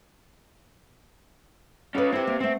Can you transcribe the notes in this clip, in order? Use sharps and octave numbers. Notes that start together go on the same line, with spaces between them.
C#4 F4 A4 B4
C4 E4 G4 F#5
A#3
A3 C4 F#5